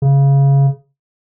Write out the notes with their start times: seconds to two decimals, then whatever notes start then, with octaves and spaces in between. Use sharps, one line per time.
0.02 C#3